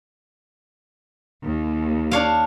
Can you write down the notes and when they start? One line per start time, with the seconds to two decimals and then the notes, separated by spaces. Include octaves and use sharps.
1.44 D#2
2.11 D4 C#5 F5